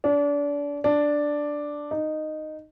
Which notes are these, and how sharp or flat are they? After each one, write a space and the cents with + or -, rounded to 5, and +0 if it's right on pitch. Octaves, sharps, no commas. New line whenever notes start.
D4 -30
D4 +0
D#4 -10